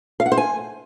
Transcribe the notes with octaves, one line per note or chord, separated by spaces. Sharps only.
F5
F#5
C5
G#5